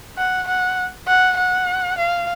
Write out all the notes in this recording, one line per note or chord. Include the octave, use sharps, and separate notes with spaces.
F#5
F#5
F#5
F#5
F5